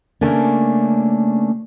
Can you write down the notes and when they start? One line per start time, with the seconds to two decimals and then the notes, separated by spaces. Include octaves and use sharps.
0.21 C#3 A3 A#3 C#4 D4